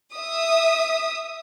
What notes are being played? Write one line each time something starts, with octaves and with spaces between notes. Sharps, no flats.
E5 D#6